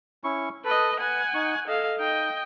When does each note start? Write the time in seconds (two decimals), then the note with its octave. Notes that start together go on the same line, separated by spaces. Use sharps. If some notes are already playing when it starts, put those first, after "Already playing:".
0.24 C#4 E4 C#6
0.65 A4 B4 D#5
1.00 B4 F#5 G#5
1.34 D#4 C#6
1.68 A4 D#5 F5
1.99 D#4 D#5 G5